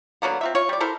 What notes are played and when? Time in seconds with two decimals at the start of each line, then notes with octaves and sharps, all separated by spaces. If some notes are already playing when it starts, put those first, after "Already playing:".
0.22 D3 F#3 A#3 B3
0.41 C4 F4 E5
0.55 F4 C#5
0.69 G3 D5
0.80 E4 A4 A#4 C5